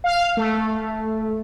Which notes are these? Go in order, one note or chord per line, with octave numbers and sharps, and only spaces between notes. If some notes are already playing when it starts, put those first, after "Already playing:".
F5
A3